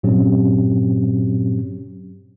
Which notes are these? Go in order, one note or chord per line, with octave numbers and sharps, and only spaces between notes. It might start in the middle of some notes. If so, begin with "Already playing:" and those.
G2 A#2 F#3 C4 C#4 G4